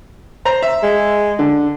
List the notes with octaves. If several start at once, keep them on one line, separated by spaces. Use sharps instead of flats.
C5 A#5
E5
G#3
D3